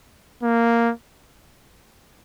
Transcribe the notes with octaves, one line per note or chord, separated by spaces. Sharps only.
A#3